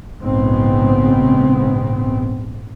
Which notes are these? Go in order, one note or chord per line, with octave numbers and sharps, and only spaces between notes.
A#1 G#2 C#3 B3 C4